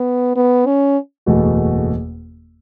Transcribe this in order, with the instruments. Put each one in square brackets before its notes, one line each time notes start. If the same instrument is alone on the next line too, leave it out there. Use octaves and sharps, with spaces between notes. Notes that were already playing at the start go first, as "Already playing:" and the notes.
Already playing: [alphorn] B3
B3
C#4
[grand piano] F#1 E2 B2 A3 F#4